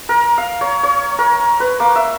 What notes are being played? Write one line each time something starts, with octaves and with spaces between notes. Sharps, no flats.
A#4
F5
C#5
C#5
A#4
B4
A#3
E5